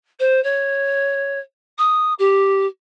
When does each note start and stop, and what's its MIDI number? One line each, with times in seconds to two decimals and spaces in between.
0.19 0.42 72
0.43 1.39 73
1.78 2.13 87
2.18 2.66 67